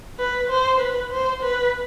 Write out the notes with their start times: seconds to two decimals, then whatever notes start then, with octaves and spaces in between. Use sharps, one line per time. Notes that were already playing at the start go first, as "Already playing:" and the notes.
0.19 B4
0.50 C5
0.80 B4
1.11 C5
1.43 B4